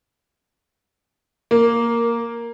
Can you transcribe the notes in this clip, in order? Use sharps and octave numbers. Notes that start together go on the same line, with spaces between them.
A#3